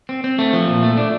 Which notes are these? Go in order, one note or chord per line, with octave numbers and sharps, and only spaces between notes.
C4
C4
A3
F3
A#2
A3
D4